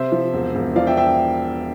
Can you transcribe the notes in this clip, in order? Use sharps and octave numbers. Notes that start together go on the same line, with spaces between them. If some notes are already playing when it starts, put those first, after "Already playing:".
Already playing: C3 C5 E5
F3
E1
E1
F3 D5 F5
E5 G5
E5 G5